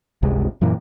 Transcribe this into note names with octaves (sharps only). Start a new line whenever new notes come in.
G1 C#2 C3 G#3
F#2 A#2 E3 A#3